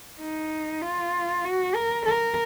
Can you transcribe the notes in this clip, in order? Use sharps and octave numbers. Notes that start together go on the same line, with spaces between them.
D#4
F4
F#4
A#4
A#4